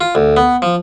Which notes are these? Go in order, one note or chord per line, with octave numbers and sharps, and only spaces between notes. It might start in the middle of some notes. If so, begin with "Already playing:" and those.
F4
D2
B3
F3